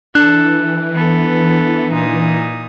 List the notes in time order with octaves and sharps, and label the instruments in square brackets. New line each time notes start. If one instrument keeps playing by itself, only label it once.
[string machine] E3 [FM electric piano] D4 [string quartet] A4 [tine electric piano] F#6
[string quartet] B3 A4
A#2 D#4 D#6